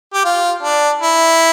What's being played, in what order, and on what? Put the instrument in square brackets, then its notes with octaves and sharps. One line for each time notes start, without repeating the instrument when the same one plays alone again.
[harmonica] G4
F4
D4
E4